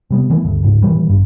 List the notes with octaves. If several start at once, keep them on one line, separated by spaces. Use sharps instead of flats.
C3 G3 B3
D#3 E3 A3 B3
D2 G2 D3
D2 G#2 C#3
A#2 D#3 E3 G3
G#1 G2